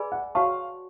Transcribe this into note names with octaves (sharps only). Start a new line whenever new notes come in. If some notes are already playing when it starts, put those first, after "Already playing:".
Already playing: G#4 B4 D5 G#5 B5
F#5
F#4 C#5 F5 F#5 A5 C#6